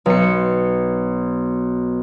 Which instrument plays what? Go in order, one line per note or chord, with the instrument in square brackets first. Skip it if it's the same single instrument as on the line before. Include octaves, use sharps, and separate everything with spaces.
[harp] B1 C#7